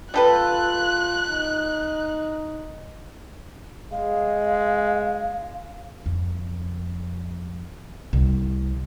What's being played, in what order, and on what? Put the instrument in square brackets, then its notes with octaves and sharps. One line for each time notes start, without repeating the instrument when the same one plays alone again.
[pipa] G3 A4 B4 [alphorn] F4 [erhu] F#6
[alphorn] D#4
[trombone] G#3 [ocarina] F5
[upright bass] F2
C2